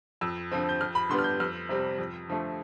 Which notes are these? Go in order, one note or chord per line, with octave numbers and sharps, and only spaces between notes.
F2 E6
D3 F3 C4
G6
F2 F6
B5
D3 G3 B3 D4 C6
F6
G6
F2 F6
C3 G3 C4
F2
D3 F3 A3